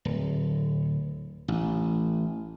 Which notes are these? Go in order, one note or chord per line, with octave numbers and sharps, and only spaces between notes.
D1
A1